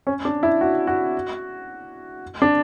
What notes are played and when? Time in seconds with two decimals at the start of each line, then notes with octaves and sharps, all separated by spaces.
0.07 C#4
0.25 D4
0.43 E4
0.61 F#4
0.87 F#4
2.42 D4